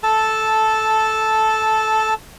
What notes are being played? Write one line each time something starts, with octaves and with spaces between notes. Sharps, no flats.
A4 A5